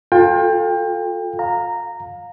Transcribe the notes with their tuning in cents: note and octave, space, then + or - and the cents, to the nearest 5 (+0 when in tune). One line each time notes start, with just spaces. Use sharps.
F4 +35 A4 +0 G5 +30
F5 +25 A#5 -10